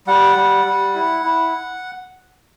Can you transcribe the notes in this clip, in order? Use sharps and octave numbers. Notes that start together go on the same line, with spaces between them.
G3 F#5
G3
G3
E4
E4